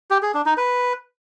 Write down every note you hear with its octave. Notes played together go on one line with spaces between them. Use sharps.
G4
G#4
D4
D#4
B4